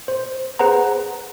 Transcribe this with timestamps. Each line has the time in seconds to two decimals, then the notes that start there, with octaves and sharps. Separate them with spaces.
0.08 C5
0.59 G#4 B4 C5 F#5 A#5